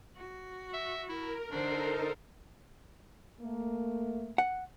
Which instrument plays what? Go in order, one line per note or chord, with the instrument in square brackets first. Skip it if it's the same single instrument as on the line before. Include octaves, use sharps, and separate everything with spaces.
[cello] F#4
[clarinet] E5
[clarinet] E4 [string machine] A#4
[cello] D3 C5 [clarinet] D4 [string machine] D#4 A4 A#4
[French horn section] A3 A#3
[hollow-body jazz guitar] F#5